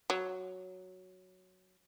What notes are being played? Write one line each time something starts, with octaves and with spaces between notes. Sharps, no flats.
F#3